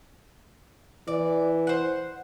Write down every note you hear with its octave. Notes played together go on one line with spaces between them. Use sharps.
E3 D5
C5 F#5